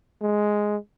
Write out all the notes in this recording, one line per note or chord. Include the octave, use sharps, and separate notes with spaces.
G#3